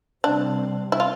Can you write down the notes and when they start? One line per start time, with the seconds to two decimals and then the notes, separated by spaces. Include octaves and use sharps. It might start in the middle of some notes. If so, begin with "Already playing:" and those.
0.24 C3 G3 C4 D4
0.92 E4
1.00 F4